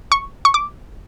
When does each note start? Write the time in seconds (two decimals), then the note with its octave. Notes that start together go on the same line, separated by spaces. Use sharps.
0.12 C#6
0.45 C#6
0.54 D6